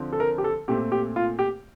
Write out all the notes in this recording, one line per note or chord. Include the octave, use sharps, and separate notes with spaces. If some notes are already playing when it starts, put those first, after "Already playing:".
Already playing: D3 F3 C4
A4
A#4
G4
A4
A#2 A3 C4 G4
G4
F4
G4